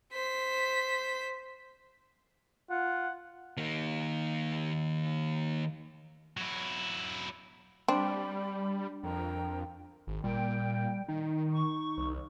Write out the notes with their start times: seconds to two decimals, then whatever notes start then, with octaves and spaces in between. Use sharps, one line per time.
0.13 C5 B6
2.70 F4 F#5
3.57 D#3 A#3
6.37 F#3 E4
7.88 G3 C4 D4 B5
9.03 F2 A#4 G5 A#5
10.07 G#1
10.24 A#2 G3 G5
11.09 D#3 D#4
11.53 C#6
11.97 C2